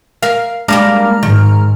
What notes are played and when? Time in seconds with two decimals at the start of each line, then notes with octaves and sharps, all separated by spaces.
0.23 A#4 F5
0.68 G3 G#3 A#3 D4 A#5 F6
1.23 G#2 D#3